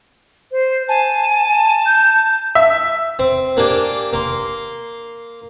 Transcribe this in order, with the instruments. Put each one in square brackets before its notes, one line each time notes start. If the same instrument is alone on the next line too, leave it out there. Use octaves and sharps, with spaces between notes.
[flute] C5
[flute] G#5 [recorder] A5
[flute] G6
[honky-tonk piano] E5
[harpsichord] C4
A#3 D4 G4 G#5
A#3 C6